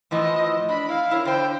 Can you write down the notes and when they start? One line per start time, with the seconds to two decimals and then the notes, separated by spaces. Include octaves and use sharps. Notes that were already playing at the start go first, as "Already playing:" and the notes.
0.11 A2 E3 F3 D#5
0.69 D4 B5
0.89 E4 F5
1.11 E4 A#4 C#5
1.25 D3 C5 G5